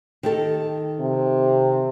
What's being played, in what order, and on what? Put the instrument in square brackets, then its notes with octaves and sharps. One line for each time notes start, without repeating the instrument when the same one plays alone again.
[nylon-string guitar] D#3 G4 A4
[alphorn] C3